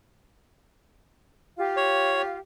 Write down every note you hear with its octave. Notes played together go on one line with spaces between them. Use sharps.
F4 G4 F5
C#5